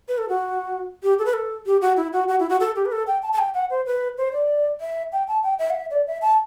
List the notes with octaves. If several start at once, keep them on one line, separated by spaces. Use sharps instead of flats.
B4
A4
F#4
G4
A4
B4
A4
G4
F#4
E4
F#4
F#4
E4
F#4
A4
G4
B4
A4
G5
A5
A5
G5
F#5
C5
B4
C5
D5
E5
G5
A5
G5
E5
F#5
E5
D5
E5
A5